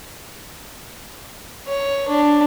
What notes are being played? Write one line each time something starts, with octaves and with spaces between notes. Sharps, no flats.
C#5
D4